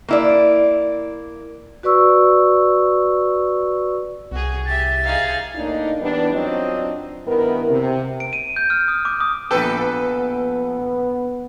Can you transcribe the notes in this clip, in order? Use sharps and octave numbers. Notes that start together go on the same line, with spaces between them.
A#3 E4 D5
F#4 B4 D5 C#6 E6
C2 F#4 G#4
G4 E5 A6
D#4 G#4 F5
A2 A#3 D4 D#4
E3 G3 B3 D4
F#3 C4 D4 D#4 F4 D#5
G2 D#3 B3 E4 A#4
C3
D7
D#7
G6
F6
D#6
D6
D#6
A#1 B3 A4 B4 G5